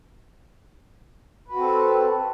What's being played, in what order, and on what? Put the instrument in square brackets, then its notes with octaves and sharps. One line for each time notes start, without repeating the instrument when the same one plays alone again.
[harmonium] B4
F#4
C4
A4